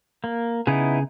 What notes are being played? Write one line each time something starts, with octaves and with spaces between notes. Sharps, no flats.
A#3
C#3 B3 D#4 E4 G#4